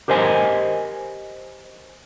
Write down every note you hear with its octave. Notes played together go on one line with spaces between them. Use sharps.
G4 A#4 C5 D#5 G#5